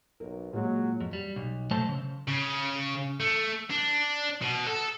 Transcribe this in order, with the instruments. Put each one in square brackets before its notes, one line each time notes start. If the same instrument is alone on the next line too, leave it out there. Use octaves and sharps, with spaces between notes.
[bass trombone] B1 [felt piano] A#4
[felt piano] A#2 G#3 [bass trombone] F#3
[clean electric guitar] F2
G3
B1
B2 F#3 A3 C5 A5
C#3
[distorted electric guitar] C#3
A3
D4
B2
A4